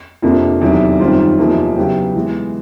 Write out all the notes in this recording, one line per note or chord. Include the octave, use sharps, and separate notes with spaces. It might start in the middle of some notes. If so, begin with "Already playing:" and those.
F2 C3 F3 A#3 D4
E2 C3 D#3 F#3
F#2 D#3 G3 C4 F4
E2 C3 F3 A#3 D#4
C#3 F#3 B3 E4 G4
E3 G#3 B3